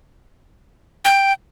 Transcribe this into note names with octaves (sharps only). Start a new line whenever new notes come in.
G5